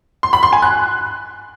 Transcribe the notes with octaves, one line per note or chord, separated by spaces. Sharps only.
C6
B5
C6
G#5
F#6